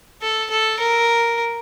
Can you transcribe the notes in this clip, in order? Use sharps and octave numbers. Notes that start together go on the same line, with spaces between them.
A4
A4
A#4